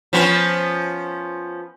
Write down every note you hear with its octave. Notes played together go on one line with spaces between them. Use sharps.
F3 B3 C#4